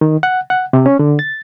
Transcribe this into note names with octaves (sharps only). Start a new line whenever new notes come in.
D#3
F#5
F#5
C3
C#4
D3
A6